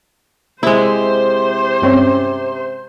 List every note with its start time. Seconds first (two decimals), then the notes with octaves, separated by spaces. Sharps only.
0.63 C3 G#3 E4 C5
1.82 G2 C4 C#4